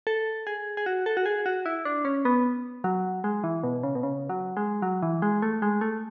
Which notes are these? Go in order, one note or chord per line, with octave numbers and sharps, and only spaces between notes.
A4
G#4
G#4
F#4
A4
F#4
G#4
F#4
E4
D4
C#4
B3
F#3
G#3
E3
B2
C#3
B2
C#3
F#3
G#3
F#3
E3
G#3
A3
G#3
A3